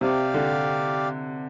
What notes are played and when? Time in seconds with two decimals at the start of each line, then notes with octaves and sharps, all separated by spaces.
0.01 C3 G4 D5 F5
0.34 D3